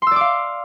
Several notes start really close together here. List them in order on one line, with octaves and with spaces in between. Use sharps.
C6 E6 D5 D6 F5